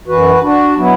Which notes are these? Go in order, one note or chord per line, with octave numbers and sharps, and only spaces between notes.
F#2 E3 F#4 B4
D4 F#4
B2 F#3 B3 E4